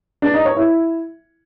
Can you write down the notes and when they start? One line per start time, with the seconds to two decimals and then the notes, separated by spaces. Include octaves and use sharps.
0.22 D4
0.34 D#4
0.45 C#5
0.56 E4